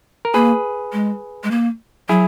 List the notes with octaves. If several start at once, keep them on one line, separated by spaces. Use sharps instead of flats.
A#4
A#3 G#4 B4
G#3
G#3
A#3
F#3 E4 G#4